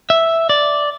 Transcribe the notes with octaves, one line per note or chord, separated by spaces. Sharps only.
E5
D5